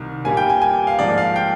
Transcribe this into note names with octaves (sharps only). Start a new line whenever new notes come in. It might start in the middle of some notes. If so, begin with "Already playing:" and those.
Already playing: C2 C3 D#3
A#2 G3 A#3 G#5
G5
G#5
G#5
F5
G#2 F3 A#3 D5
F5
G5